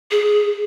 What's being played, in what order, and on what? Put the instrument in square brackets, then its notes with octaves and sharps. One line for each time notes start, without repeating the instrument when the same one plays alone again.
[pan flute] G#4